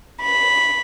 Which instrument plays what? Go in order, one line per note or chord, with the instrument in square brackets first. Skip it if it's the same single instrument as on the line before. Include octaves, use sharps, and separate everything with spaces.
[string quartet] B5